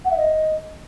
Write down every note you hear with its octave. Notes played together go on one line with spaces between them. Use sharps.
F#5
E5
D#5